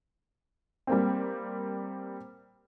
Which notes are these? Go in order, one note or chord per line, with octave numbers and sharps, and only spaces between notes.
G3 A#3 C4